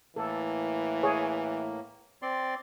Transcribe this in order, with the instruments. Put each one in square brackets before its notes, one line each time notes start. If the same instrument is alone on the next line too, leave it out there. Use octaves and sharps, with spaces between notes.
[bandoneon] A2 A#3 [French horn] E3 [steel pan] A4
[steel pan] G#4 C#5
[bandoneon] C4 D5 C6